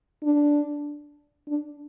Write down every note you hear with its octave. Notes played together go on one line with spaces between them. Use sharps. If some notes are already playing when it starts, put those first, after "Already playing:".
D4
D4